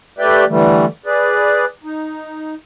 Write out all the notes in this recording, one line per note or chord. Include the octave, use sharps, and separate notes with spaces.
A3 G4 B4 D5 E5 G5
D3 E3 G3 A3
G#4 B4 D5
D#4